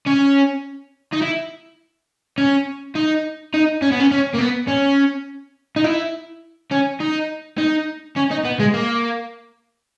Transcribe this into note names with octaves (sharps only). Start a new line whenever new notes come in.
C#4
D#4
E4
C#4
D#4
D#4
C#4
B3
C#4
C#4
A#3
B3
C#4
D#4
E4
C#4
D#4
D#4
C#4
D#4
B3
G#3
A#3